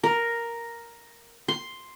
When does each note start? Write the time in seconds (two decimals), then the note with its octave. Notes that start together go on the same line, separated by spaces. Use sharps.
0.04 A#4
1.48 C6